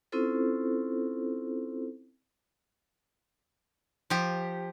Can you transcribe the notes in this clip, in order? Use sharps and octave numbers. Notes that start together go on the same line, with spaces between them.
C4 C#4 E4 F4 A4 C5
F3 G4